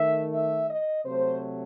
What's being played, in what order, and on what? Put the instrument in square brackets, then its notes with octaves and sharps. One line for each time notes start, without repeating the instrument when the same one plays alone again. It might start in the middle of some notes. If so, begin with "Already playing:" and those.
Already playing: [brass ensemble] D#3 A3 E5
E5
D#5
C3 F#3 A3 C5